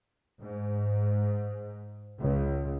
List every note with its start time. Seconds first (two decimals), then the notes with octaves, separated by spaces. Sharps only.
0.41 G#2
2.19 C#2